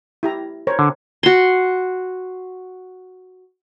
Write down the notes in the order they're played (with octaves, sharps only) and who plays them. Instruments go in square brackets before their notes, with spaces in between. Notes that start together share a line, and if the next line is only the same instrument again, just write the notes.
[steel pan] E4 G4 A#5
A#4 C5 C#5
[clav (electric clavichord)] D3
[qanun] F#4 C6